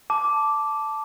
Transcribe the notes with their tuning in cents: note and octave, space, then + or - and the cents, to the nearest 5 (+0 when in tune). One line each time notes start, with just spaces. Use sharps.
A5 -5 D6 -5